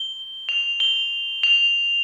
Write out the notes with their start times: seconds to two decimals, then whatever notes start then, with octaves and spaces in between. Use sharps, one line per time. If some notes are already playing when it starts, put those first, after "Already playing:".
Already playing: G7
0.49 F7
0.80 G7
1.43 F7